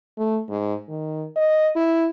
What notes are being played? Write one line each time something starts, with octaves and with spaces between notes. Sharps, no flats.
A3
G#2
D#3
D#5
E4